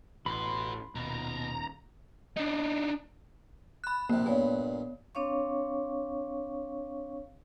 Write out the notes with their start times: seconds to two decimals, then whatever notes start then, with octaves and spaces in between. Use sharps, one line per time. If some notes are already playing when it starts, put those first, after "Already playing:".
0.26 A1 F#4 B4 B5 C6
0.95 D#1 B2 A#5
2.36 D4 D#4
3.84 B5 F#6
4.10 A#1 C3 A#3
4.26 G2 A#2 B3 C#5 F5
5.15 C4 D4 C#5 F5 C#6